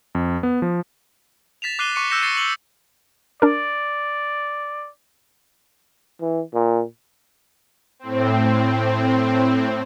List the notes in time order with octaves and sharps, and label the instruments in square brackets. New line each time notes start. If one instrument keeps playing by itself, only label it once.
[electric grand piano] F2
B3
F3
[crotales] A6 B6 E7 F7
D6 F#6 C7 D#7 G7
C#6 D6 C#7 D#7
E6 F#6 G6 A#6 C#7 E7
A6 C7 C#7 G7
C#7 F#7 G7
[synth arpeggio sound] D4 A#4 [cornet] D5
[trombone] E3
A#2
[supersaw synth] A2 C4